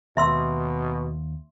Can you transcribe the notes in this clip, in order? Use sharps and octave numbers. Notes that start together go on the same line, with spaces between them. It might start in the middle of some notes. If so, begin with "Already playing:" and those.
D#2 B2 E5 C6 E6